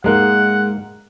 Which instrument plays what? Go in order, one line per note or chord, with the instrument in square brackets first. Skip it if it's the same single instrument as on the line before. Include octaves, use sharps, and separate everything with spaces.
[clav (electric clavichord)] G#2 A#3 D#4 [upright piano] G#3 A#4 [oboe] F#5